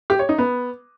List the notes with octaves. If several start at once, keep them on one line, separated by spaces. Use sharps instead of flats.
G4
C#5
D#4
B3